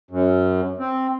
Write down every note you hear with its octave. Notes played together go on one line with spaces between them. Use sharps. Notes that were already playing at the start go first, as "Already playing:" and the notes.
F#2
C4